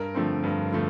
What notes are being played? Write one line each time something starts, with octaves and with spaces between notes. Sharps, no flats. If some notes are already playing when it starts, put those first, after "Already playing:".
Already playing: G2 A#4
D3 F3 A3 C4
G2
D3 F3 A3